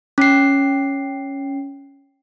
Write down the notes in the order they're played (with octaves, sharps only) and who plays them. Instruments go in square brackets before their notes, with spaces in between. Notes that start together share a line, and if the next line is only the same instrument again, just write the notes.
[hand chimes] C#4 C7